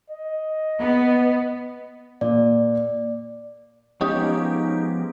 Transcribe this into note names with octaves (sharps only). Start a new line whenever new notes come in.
D#5
B3
A#2 D5
F3 G#3 B3 C#4 D#4 G4